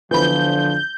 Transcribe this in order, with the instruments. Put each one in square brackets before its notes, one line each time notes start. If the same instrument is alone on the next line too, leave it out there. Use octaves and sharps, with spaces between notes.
[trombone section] D3 F3 [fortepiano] E3 B3 B5 [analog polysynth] G6